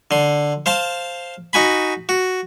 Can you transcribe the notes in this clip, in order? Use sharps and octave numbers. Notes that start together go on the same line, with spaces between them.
D3 C6
C5 F5 A5 C6
D#4 F#4 G#5 B5
F#4